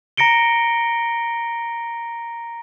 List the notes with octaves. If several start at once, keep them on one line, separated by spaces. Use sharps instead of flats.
A#5 A#6 C#7 D7 G7